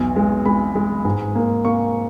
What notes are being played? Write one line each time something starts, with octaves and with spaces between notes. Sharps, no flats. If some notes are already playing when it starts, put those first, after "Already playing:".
Already playing: B1 E2
G#3
G#3 B5
G#3
G#2
A#3
A#3 C#6